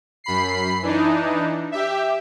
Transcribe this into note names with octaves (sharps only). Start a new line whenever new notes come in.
F#2 B5 C7
E3 D4 D#4
G4 E5